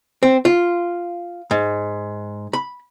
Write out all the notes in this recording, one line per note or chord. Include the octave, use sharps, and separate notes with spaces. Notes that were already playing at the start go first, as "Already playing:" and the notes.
C4
F4
G#2
B5